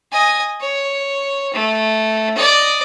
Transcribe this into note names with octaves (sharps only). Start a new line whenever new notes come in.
D#5 G#5
C#5
A3
D5 D#5